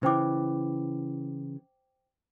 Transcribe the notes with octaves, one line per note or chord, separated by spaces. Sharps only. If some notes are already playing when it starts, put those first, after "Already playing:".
C#3 E3 C5 G5 D6